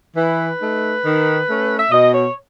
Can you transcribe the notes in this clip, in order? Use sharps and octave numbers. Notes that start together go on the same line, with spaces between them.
E3 B4
A3 D#4
D#3
A3 C#4
E5
B2 D#5
C#5